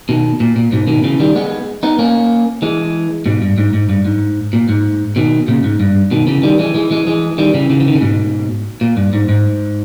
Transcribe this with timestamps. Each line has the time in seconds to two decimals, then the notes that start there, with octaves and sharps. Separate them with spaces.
0.09 B2 D#3
0.40 A#2
0.56 A#2
0.72 G#2 B2
0.88 B2 D#3
1.04 C#3 E3
1.20 D#3 G3
1.36 G#3 B3
1.83 B3 D#4
1.99 A#3 C#4
2.62 E3 G#3
3.26 G#2 B2
3.42 G2
3.58 G#2
3.73 G#2
3.89 G2
4.05 G#2
4.53 A#2
4.69 G#2
5.16 B2 D#3
5.48 A#2 C#3
5.64 G#2
5.80 G2
6.11 B2 D#3
6.27 C#3 E3
6.43 D#3 G3
6.59 E3 G#3
6.75 E3 G#3
6.91 E3 G#3
7.07 E3 G#3
7.38 D#3 G3
7.54 C#3 E3
7.70 C#3 E3
7.80 E3
7.88 D#3
7.94 C#3
8.01 G#2 B2
8.81 A#2
8.97 G2
9.13 G#2
9.29 G#2